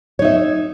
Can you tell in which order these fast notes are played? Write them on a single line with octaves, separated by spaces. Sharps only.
C#5 D#4 E5